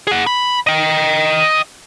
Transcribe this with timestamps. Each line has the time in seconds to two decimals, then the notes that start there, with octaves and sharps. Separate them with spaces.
0.07 G#4 F#5
0.27 B5
0.67 D#5 G5